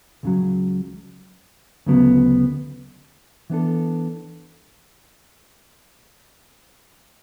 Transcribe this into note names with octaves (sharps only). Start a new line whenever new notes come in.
C#2 C#3 F#3
D2 C#3 F#3 B3
E3 B3 D4 A4